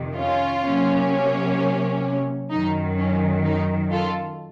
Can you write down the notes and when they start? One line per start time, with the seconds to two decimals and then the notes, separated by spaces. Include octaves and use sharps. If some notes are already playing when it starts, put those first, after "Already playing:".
Already playing: F2 C3 D#3
0.17 C#4 F4
0.64 C3 F#3 A#3 C#4
2.51 F#2 D#3 F#3 D#4
2.98 C#4
3.45 D#4
3.92 F4 A4